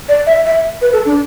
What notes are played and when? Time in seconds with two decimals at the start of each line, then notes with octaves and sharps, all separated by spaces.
0.09 D5
0.27 E5
0.45 E5
0.81 B4
0.93 A4
1.06 D4